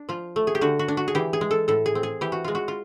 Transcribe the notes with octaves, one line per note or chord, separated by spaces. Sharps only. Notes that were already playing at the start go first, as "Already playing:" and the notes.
Already playing: D4
F3 F4
A3
G#4
G4
D3 F#4
F#4
D4
F#4
G#4
E3 G4
G#4
G#3
A4
A2 A4
G#4
C4
G#4
E3 G4
F#4
G#3 F4
F#4
F4